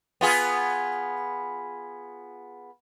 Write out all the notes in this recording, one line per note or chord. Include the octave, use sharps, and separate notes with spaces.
B3 F4 G#4